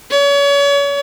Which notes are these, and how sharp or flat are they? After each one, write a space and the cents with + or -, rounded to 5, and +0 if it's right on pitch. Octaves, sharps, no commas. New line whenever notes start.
C#5 +35